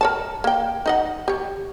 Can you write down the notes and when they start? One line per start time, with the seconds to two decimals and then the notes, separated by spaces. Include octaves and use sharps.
0.01 A#4 C#5 A5
0.44 A#3 G5
0.86 D#4 D#5 F#5
1.28 G4 C#5